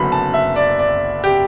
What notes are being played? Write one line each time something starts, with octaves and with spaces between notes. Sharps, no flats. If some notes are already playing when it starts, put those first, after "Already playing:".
Already playing: F#1 F#2 D3 F#3 B3 B5
A5
E5
D5
D5
G4